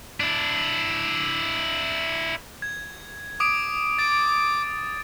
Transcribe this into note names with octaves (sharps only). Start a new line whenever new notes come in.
D4 E4
G#6
D6 D#6 D7
D6 A6